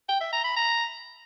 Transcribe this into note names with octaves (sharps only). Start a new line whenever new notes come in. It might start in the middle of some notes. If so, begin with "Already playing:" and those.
G5
E5
A#5
B5
A#5